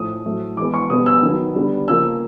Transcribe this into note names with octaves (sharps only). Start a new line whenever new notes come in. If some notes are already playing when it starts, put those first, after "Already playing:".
Already playing: A2 F3 A3 C4 D#6
A2 F#3 A3 C4
E3 G#3 B3 D6
C#6
B2 G3 B3 D#6
E6
D#3 F#3 B3
D3 G3 B3
C#3 F3 A#3 E6